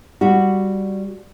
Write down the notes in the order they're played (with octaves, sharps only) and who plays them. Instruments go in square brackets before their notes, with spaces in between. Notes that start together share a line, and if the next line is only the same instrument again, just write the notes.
[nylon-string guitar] G3 F#4